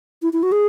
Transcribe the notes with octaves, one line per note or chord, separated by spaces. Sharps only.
E4
E4
F#4
G#4